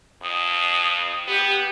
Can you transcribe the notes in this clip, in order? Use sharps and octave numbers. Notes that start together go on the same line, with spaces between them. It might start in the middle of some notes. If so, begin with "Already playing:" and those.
F2 D#6
B3 G4